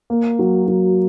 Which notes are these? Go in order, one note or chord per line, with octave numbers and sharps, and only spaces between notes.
A#3
F#3
F#3